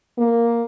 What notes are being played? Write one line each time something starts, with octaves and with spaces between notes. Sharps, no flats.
A#3